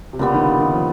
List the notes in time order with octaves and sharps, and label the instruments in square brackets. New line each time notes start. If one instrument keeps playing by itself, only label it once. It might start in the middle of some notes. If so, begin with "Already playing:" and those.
[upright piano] C3
[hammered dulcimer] A#2 G3 B3 [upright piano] C#3
[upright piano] D#3
D3
D#3
F3